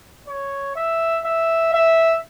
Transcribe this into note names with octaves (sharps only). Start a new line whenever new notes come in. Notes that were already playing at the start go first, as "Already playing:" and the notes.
C#5
E5
E5
E5